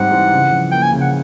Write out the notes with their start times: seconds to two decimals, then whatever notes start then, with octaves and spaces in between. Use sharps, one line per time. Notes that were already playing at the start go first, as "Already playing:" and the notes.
Already playing: G#2 G3 C4 D#4 F#5
0.12 E3
0.32 C#3
0.52 F3
0.72 A#3 G5
0.82 G#5
0.92 C#3
1.01 F#5